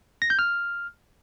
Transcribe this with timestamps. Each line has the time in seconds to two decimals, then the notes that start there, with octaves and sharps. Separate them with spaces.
0.22 A#6
0.30 G6
0.39 F6